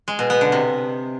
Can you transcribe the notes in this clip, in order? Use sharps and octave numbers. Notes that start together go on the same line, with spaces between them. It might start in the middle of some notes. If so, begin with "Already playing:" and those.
G#3
B2
B3
D3
C3